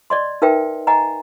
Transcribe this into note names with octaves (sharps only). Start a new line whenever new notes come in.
D5 D#5 C6
D#4 A#4 B4 E5 G5
D#5 F#5 G#5 A#5